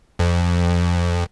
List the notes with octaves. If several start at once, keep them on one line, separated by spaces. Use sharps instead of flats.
F2